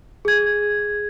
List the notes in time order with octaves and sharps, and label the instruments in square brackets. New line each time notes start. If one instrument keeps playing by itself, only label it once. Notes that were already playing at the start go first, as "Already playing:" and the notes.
[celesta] G#4 G#6